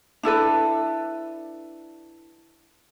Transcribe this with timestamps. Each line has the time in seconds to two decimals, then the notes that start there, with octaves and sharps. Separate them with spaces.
0.23 D4 E4 A4 B4